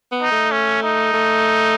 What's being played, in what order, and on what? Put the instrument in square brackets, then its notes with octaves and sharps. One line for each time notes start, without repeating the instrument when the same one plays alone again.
[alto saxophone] B3
[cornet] D#4
[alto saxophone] A3
[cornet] C#4
D#4
[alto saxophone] A3